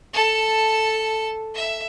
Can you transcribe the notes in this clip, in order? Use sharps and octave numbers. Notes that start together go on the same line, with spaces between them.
A4 A5
E5